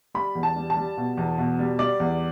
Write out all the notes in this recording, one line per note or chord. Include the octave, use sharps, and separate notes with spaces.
G3 B5
E2
A5
G3
A5
G3
B2
E2
B2
G3
G3 D5
E2